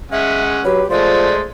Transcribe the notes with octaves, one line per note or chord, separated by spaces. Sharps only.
G#3 C#4 E5 F#5
F#3 G4 B4
F3 G#3 A3 C5 D5